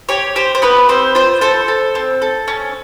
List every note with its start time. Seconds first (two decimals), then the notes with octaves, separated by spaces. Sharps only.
0.09 G4 C#5
0.36 G4 C5
0.55 C5
0.62 B3 B4
0.89 C4 C5
1.15 F4 C5
1.41 A4 C5
1.68 A4
1.95 C4
2.22 A4
2.48 C#4